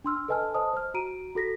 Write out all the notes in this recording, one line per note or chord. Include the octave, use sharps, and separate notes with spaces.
D4 C6 E6 F6
A4 B4 D#5 G#5 A5 F6
C5 D#5 A5 D#6
C5 F6
F#4 A#5 D7 D#7
F#4 A4 A#6 B6